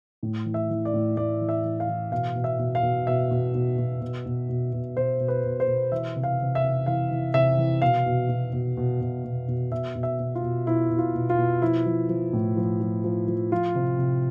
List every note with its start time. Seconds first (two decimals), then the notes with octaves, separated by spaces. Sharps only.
0.23 A2
0.45 E3
0.54 E5
0.70 E3
0.85 D5
0.94 A2
1.17 A2 D5
1.41 E3
1.49 E5
1.64 E3
1.80 F5
1.88 E3
2.12 B2 F5
2.35 B2
2.44 E5
2.59 B2
2.75 F5
2.83 B2
3.07 B2 E5
3.31 B2
3.55 B2
3.78 B2
4.01 B2
4.26 B2
4.49 B2
4.73 B2
4.97 B2 C5
5.20 B2
5.28 B4
5.44 B2
5.60 C5
5.68 B2
5.92 E3 E5
6.16 C3
6.23 F5
6.40 C3
6.55 E5
6.63 C3
6.86 E3 F5
7.11 E3
7.34 C3 E5
7.58 E3
7.82 B2 F5
8.06 B2
8.29 B2
8.53 B2
8.77 B2
9.01 B2
9.25 B2
9.48 B2
9.71 B2 E5
9.95 B2
10.03 E5
10.20 B2
10.35 F4
10.43 B2
10.67 B2 E4
10.91 B2
10.98 F4
11.15 B2
11.30 F4
11.38 B2
11.61 F3 E4
11.86 F3
12.09 F3
12.33 A2
12.57 F3
12.80 F3
13.04 F3
13.28 F3
13.52 F3 F4
13.75 C3
13.99 C3